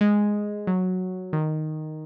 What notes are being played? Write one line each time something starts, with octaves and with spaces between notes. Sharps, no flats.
G#3
F#3
D#3